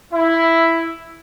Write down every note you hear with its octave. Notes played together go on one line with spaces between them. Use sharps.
E4